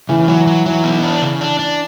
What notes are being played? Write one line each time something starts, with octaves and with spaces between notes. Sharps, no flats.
C#3 E3
E3 F#3
F#3
E3 F#3
B3
D4
C#3
D4
D4